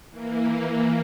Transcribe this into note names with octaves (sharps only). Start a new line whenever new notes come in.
E3 A#3